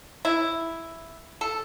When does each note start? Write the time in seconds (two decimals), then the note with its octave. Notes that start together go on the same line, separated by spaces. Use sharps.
0.25 E4
1.41 A4